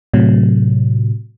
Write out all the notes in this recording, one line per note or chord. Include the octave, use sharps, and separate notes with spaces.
A2 C3 F#3